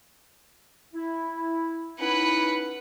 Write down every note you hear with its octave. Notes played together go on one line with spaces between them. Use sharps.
E4
C#4 D#4 E4 B4 F#5